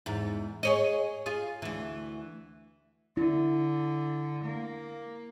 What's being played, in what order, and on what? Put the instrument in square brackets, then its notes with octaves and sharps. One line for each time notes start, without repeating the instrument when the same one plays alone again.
[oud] E2 G#2
G#4 C#5 D#5
F4 G#4
D2 E3
[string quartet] D3 [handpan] E4
[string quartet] A#3